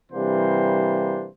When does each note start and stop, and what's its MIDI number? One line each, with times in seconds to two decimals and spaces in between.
0.12 1.28 48
0.12 1.28 52
0.12 1.28 55
0.12 1.28 58
0.12 1.28 62
0.12 1.28 72